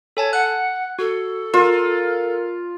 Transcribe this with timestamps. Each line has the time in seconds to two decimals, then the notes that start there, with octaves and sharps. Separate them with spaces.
0.17 A4 C#5 G#5 A5
0.33 F#5 F#6
0.99 F#4 A4
1.54 F4 A#4